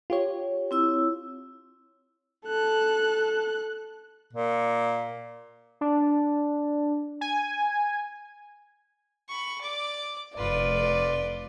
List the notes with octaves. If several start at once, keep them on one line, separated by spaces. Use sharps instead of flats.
F4 G4 C#5
C4 E4 E6
A4 F#6
A#2
D4
G#5
B5 C#6
D5 D6
F1 F4 B4 D5